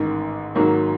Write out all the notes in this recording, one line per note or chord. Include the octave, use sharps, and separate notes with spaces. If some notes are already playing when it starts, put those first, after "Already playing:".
Already playing: A1 G#2 D#3
G#1 G#2 D#3 F#3 A#3